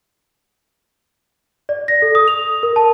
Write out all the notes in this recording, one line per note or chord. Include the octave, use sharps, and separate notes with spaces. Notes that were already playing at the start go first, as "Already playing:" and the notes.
D5
A#6
A4
D#6
F7
A#4
A5